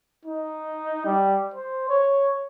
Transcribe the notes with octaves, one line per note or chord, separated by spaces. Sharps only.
D#4
G3
C5
C#5